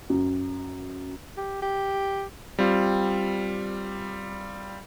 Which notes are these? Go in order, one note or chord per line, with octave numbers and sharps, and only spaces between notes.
F#2
G4
G4
G3 C4 F4